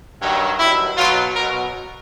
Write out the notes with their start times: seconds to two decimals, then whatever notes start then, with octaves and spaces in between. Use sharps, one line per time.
0.22 G2 D#3 F#3
0.59 G2 D#3 F#3 E4
0.97 B2 F#3 F4
1.34 B2 F#3 A#4